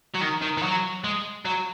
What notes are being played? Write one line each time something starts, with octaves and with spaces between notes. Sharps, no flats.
F#3
D#3
D#3
D#3
F#3
G#3
F#3